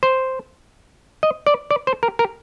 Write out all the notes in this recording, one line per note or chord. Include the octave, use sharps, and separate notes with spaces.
C5
D#5
D5
D5
C5
A#4
A#4